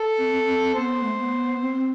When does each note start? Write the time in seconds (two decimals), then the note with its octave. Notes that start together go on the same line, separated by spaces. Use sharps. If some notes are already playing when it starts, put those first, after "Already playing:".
Already playing: A4
0.18 C4
0.32 C4
0.47 C4
0.74 B3 C5
1.03 A3
1.18 B3
1.61 C4